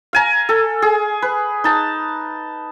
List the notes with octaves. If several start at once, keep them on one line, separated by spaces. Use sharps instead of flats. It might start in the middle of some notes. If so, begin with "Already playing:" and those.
F5 G#5 A#5
A4
G#4
B4
D#4 A5